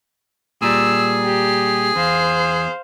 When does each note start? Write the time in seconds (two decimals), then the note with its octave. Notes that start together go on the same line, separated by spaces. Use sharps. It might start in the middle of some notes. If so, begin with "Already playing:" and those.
0.62 A#2 G3 G#4 E6
1.25 G4
1.96 E2 C5 F5